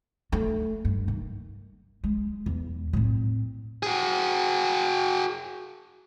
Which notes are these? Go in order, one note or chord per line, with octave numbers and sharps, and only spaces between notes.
A3
G2
D#3
G#3
E2
A2 C4
F#4 G#4